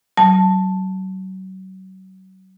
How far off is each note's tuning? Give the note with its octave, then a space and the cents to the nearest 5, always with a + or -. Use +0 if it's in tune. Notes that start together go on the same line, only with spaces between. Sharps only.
F#3 +35 A5 +0